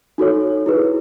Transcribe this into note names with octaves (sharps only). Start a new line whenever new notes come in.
D#4 F#4 A4 C#5
E4 G#4 B4